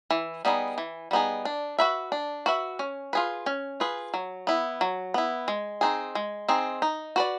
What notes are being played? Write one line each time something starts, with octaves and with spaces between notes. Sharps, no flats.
E3
G3 B3 D#4 G#4
E3
G3 B3 D#4 G#4
D4
F#4 B4 E5
D4
F#4 B4 E5
C#4
F4 G#4 B4
C#4
F4 G#4 B4
F#3
B3 E4
F#3
B3 E4
G#3
C4 D#4 G#4
G#3
C4 D#4 G#4
D#4
F#4 B4 D5